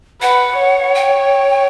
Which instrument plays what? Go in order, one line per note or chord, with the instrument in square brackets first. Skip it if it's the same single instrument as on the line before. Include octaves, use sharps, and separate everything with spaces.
[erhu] B4 [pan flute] F#5
[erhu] C#5
[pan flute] G5